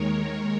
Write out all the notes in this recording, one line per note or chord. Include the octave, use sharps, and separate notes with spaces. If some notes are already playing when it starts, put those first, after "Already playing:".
Already playing: D#2 D#3 G#3 A#4 C#5